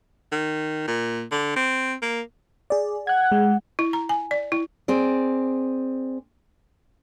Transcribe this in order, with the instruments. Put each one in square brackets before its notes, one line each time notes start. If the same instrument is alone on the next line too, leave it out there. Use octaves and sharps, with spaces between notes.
[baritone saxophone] D#3
A#2
D3
C4
A#3
[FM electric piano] G#4 D5
[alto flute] F#5 [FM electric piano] F#6 G#6
[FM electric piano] G#3
[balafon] E4
A#5
G#5
D5
E4
[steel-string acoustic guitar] C4 G#4 D5